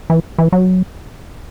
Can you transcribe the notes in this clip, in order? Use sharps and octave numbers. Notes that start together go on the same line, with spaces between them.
E3
E3
F#3